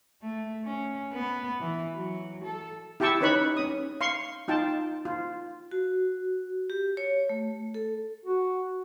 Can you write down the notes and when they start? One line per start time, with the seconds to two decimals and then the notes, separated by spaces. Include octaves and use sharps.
0.22 A3
0.64 C#4
1.13 B3
1.61 E3
1.95 F#3
2.44 A4
3.00 E4 G4 G5 A5 C#6 E6
3.21 C#4 D#4 B4 C#5 B5 C#6
3.57 C#4 D#6
4.01 F5 C6 C#6
4.48 D#4 F4 G5 A5
5.05 F4
5.71 F#4
6.70 G4
6.97 C#5
7.29 A3
7.74 A4
8.25 F#4